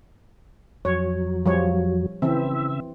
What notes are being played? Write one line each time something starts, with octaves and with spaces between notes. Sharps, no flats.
F2 F#3 C#5
F3 G3 C#5
C#3 E3 C4 E5